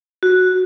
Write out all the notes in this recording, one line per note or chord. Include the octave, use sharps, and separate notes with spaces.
F#4